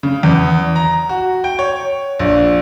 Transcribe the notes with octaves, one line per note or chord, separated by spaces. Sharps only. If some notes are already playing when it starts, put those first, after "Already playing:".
C#3
E2
A#5
F#4
G5
C#5
A#1